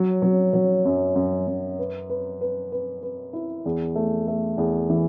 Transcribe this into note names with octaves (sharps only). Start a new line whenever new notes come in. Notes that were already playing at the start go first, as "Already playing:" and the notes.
Already playing: F#3
F#3
F#3
F#2
F#2
F#2
B4
B4
B4
B4
B4
E4
E2
A3
A3
E2
E3